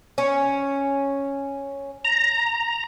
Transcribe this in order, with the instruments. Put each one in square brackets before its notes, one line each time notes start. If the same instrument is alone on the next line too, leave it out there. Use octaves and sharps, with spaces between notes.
[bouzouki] C#4
[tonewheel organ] A#5